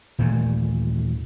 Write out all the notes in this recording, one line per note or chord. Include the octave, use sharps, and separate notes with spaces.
D#2 A#2 E3 A3